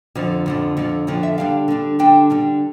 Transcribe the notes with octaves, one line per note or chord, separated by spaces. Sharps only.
F2 D3 F3
F2 D3 F3
F2 D3 F3
F2 D3 F3 C#5
E5
D3 G3 D4 F5
D3 G3 D4
D3 G3 D4 G5
D3 G3 D4